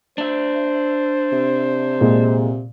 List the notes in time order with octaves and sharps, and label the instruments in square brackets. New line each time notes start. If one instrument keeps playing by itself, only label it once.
[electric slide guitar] D4 E5 [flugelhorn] C5
[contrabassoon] C3
[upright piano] A#2 G#3